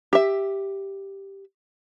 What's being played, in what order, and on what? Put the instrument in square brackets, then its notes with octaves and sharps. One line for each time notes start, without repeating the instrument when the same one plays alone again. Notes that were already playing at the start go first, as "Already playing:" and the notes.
[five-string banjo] G4 E5